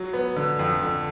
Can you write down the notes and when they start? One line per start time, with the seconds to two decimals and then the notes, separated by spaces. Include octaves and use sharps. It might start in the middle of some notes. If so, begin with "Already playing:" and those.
Already playing: F#3
0.13 B3
0.36 D3
0.59 F2
0.82 D3